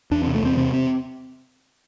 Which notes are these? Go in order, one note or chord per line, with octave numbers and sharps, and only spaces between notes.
E2 D4
C3 C4
A3
E2 C4
C3 C4
C4